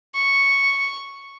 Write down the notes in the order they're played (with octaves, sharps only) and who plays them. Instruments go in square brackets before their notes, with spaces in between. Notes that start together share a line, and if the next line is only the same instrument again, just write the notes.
[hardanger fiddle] C#6